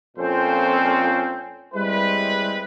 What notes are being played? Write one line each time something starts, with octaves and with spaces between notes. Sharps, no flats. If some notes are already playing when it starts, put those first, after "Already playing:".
F2 A#2 C4 C#4 A4 C5
G3 G#3 C4 E4 B4